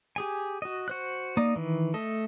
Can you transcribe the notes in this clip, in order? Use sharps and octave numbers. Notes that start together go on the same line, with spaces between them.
G4 G#4 G#5
F#4 D#5
F#4 C5 F#6
A#3 D#4 D5 D#6
D#3 E3
A3 A4 D#5